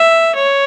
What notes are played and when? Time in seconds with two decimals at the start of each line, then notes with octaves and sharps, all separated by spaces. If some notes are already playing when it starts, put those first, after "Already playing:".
Already playing: E5
0.35 C#5